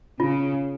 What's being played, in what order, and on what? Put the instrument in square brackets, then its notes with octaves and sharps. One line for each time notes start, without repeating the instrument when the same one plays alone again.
[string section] C#3 [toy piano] F4